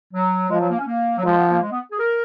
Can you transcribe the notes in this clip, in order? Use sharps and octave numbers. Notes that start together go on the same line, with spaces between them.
F#3
F3 G#3
F#3
A#3
C#4
A#3
F#3
F3 G#3
B3
A#3
G#3
B3
G#4
A#4